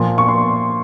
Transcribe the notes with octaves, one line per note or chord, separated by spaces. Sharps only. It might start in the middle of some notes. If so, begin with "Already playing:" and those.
Already playing: A#2 F3
C#6
C6